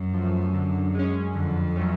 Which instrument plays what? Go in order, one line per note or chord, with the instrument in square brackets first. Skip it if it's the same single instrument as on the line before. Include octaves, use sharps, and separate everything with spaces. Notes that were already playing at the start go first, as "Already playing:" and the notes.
Already playing: [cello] F#2
[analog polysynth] F3 A3
D3
G#3 C#4
[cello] F2 [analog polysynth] D3
[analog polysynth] F#3 A3 C#4